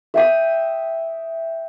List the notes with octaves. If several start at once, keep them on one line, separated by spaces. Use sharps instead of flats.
E5 G5 D#6